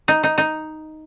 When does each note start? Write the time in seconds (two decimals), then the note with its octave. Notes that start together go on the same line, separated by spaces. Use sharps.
0.08 D#4
0.23 D#4
0.38 D#4